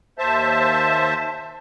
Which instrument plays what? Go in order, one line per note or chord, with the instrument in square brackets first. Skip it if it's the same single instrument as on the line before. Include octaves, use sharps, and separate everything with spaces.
[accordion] D#2 C5 E5 A5